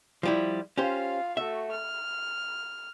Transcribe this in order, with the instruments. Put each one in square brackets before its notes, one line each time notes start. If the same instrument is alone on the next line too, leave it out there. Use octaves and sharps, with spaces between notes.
[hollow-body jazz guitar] F3 G3 E4
[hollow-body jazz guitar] C#4 G4 C5 [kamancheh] F4 F5
[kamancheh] A3 F#4 [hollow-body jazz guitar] E5
[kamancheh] F6